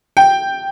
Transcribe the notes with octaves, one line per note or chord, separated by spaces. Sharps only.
G5